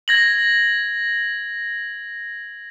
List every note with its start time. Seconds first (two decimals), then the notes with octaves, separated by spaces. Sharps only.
0.08 G#6 A#6 F#7